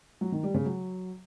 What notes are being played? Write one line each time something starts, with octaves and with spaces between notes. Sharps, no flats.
F#3
D#3
G3
C#3
F#3